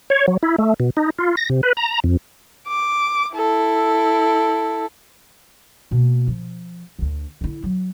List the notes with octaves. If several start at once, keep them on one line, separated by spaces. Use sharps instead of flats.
C#5
F#3
E4
A3
B2
D#4
F4
A#6
C3
B4
A#5
F2
D6
E4 A4
B2 A#3
F3
D2 D3
D3 E4
F#3